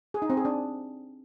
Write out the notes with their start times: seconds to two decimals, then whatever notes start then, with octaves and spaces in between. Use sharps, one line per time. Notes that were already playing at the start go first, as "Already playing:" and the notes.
0.14 G#4
0.22 D#4
0.30 C4
0.37 G#4
0.45 D4